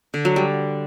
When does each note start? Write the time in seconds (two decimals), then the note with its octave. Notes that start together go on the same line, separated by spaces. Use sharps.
0.14 D3
0.25 F#3
0.36 G3